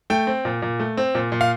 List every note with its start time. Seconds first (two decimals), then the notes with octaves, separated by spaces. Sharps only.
0.10 A3 G5
0.27 C4
0.45 A#2
0.62 A#2
0.80 A3
0.97 C4
1.15 A#2
1.32 A#2
1.41 F5